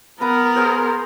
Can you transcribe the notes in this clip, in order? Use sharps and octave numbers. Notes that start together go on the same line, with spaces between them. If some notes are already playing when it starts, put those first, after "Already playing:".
B3 A#4 B4 A#5
G#4 C5